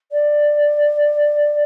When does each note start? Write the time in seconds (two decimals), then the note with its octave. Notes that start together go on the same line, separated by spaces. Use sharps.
0.11 D5